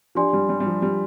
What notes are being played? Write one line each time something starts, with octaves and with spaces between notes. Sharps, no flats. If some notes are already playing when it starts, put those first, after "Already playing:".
F3 D4 G4 D5 G#5 C6
G3
G3
G3
F3
G3